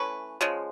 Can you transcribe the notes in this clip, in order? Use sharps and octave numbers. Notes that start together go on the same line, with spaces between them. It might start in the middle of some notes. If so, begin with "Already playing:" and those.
Already playing: E3 A3 C#4 B4
C#3 F3 G#3